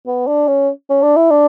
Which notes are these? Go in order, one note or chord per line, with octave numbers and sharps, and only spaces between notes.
B3
D4
C#4
C#4
D4
E4
D4